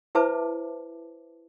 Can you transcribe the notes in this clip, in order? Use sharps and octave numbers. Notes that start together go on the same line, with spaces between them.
E4 B4 C5 E5 A5 D6